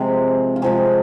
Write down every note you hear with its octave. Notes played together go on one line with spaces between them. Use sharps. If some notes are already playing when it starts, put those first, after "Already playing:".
Already playing: C3 F3 G#3 G#4
F4
C3 F3 G#3 G#4